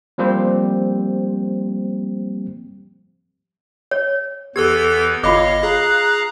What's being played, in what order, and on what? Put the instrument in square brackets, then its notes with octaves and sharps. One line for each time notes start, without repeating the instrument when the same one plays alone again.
[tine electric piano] F3 G3 A#3 C4 G4 C5
[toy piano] C#5
[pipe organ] E2 E3 B3 [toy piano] G4 [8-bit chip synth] A4 E6 G#6
[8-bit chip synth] G1 D#5 [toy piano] F4 B5 D6 [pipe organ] C#5 F5
[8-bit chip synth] G#4 [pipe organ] F5 A#5 F#6